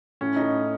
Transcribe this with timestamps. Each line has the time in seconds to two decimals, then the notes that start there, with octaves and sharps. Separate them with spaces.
0.21 A2 C#4
0.36 D#4
0.42 A2